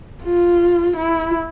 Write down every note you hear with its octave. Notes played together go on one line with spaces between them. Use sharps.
F4
E4